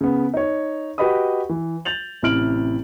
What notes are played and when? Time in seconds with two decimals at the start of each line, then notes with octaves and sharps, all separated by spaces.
0.01 C#3 B3
0.34 D#4 C#5
0.98 F#4 G4 B4 D#5 B5 D#6
1.49 E3
1.85 G6 A6 F7 F#7
2.22 A1 C3 E4 F6 D7 F#7